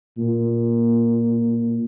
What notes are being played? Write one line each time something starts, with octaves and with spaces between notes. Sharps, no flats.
A#2